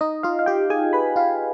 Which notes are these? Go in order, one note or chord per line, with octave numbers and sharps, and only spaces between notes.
D#4 D#5
F4 F5
F5
G4 G5
G#4 G#5
B4 B5
F4 F5